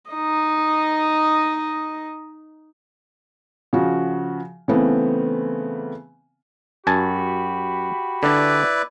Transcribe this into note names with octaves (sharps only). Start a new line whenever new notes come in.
D#4 D#5
C#3 F3 F#4
C#3 E3 A3 B3 C4
F#2 F#4 G4 G#5 A5 B5
D3 D4 E4 B4 D5